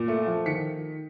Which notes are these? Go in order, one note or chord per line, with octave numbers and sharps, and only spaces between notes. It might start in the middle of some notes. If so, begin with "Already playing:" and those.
Already playing: A#2
A3
F3
D#3 B6 C#7